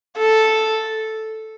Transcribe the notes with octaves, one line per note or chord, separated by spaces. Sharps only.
A4